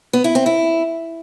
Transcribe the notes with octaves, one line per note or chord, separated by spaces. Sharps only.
B3
E4
C4
E4